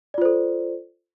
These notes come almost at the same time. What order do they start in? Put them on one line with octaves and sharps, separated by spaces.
D5 F4 C5 A4